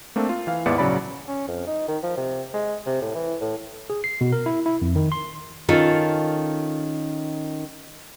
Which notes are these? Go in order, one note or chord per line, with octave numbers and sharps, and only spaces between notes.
A3 A#3 C4 D4
F4
E3 F5
D#2 G#2 B3 E4 D5 C#7
A#1 C#3 F#3 D5 B5
C#4
F2
D#4
D#3
F3
C3
G#3
C3
A2
E3
A2
G#4
C7
B2
A#4
E4
E4
F2
D#3
C6
D#3 C#4 F4 A4